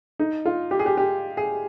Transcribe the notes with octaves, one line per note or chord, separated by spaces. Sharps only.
D#4
F4
G4
G#4
G4
G4
G#4